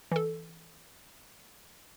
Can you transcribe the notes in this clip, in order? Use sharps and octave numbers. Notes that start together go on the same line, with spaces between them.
E3 A4